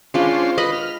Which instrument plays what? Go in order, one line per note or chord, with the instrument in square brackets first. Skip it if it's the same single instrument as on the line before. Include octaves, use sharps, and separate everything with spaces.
[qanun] G#3 F4 B5 [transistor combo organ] C#4 D4 C5
[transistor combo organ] B4 [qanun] D#5 B5
[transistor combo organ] F6